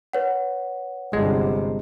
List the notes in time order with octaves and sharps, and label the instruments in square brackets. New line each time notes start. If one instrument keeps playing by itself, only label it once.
[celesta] B4 C#5 F#5
[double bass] G1 C3 [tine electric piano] G#3